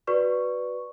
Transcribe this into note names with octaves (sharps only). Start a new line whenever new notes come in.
F#4 B4 D5 C#6